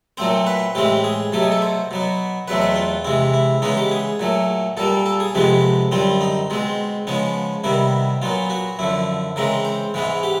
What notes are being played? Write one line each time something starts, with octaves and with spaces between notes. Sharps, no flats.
A#2 F#3 A3 C4 C5
B4
A2 E3 G#3 C4 G4
G#4
B2 F#3 A3 G4
G#4
A4
C5
B2 F#3 B3
E2 B2 F#3 A3 C4 B4
B4
F4
C3 E3 G#3 E4
E4
C#3 E3 G#3 B3 D#4
G4
G#4
A#2 F#3 A3
A#2 G3 A#3 A4
A4
G#4
F2 C3 F3 G#3 B3 G4
F#2 D3 G3 C4 F4
D#4
B2 G#3 C4
C#3 F3 G#3 B3 C#4
C3 D#3 G3 B3 E4
A#2 F#3 B3 F4
F#4
F#2 D3 F3 E4
C#3 E3 G#3 C4 A#4
C5
G#2 E3 G#3 B3
G4